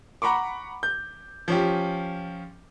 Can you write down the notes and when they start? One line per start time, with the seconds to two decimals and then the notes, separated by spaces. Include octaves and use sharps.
0.22 F#5 A#5 B5 C#6 D6
0.83 G6
1.48 F3 C#4 G4